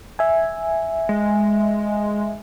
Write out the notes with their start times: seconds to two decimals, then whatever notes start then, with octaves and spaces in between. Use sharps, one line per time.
0.19 E5 G#5
1.09 G#3